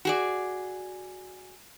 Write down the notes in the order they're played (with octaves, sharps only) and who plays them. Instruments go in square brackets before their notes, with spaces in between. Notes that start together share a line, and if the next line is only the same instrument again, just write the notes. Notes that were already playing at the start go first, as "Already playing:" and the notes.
[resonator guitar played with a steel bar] F#4 G#4 D5